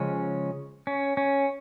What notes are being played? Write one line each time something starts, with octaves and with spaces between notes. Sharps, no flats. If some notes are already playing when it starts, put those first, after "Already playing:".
Already playing: C#3 F3 G#3 C#4
C#4
C#4